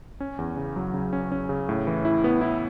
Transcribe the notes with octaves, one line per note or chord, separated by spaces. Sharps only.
C#4
E2
C#3
F#3
C#3
C#4
C#4
C#3
A2
E3
E4
B3
E4